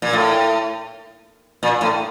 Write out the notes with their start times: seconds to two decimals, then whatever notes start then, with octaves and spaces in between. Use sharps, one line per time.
0.02 A#2
0.13 A2
1.63 A#2
1.81 A2